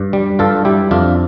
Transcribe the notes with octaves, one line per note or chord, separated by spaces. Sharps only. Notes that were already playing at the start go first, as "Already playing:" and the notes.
Already playing: G2
G3
G2 F4 A4
G3 E4 G4
F2 D4 F4